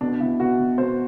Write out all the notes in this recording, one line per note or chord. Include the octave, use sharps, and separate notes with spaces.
B2 D4
B2 E4
B2 F#4
B2
B2 C5